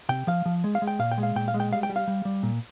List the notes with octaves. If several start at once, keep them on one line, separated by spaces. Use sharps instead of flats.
C3 G5
F3 F5
F3
G#3
F5
G#3
G5
A#2 F5
G5
G#3
F5
A#2 G5
F5
G#3
G5
G3 F5
G5
G3
F5
G3
G3
A#2